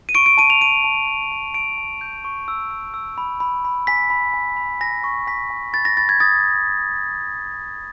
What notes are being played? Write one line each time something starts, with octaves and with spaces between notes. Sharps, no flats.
D#7
C#6 D7
D7
A5 D#7
F7
A5 D#7
A5
A5
A5
A5 D7
A5
G6
C#6
E6
E6
E6
B5
B5
B5
G#5 B6
B5
G#5
B5
G#5 A#6
C#6
G#5 B6
G#5
B5 A6
A#6
B5 A6
G#6
D#6 A6